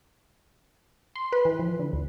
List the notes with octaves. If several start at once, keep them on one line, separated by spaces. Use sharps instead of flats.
C6
B4
E3
F3
D3
D2